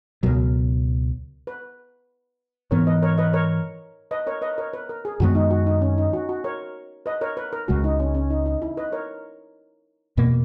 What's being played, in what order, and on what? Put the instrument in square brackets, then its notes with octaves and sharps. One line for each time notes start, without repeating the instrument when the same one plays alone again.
[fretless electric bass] C#2 B2 F#3 [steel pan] A#4
[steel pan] B4
[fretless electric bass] G#2 E3 B3 [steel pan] A#4 C#5
[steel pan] B4 D#5
A#4 C#5
B4 D#5
A#4 C#5
B4 D#5
A#4 C#5
B4 D#5
A#4 C#5
B4
A#4
G#4
[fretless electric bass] F#2 D#3 G#3 B3 [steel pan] F#4
[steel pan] D#4
F#4
D#4
C#4
D#4
F#4
F#4
A#4 C#5
B4 D#5
A#4 C#5
B4
A#4
[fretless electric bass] C#2 C#3 G#3 [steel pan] F#4
[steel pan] D#4
C#4
C#4
D#4
D#4
E4
B4 D#5
A#4 C#5
[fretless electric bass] E2 B2 A#3